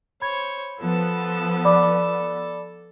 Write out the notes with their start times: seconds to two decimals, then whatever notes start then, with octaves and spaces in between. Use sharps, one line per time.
0.22 C5 C#5 B5 G#6
0.80 F3 B3 A4 A5
1.65 D5 B5 D6